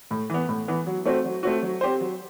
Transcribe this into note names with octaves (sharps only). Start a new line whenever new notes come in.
A2
E3 B3
A2
E3 B3
F#3
A3 C4 F#4
F#3
A3 C4 F#4
F#3
C4 G4 C5
F#3